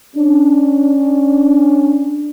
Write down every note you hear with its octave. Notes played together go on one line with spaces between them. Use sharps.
C#4 D4